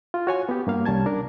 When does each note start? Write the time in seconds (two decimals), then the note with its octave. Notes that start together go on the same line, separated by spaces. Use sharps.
0.14 F4
0.27 F#4 C#5 G#5
0.49 B3 G4
0.67 G2 A#3 F5
0.85 C2 G3 C#4 A5 G#6
1.06 D4 A#4